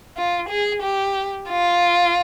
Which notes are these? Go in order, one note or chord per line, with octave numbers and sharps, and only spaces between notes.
F4
G#4
G4
F4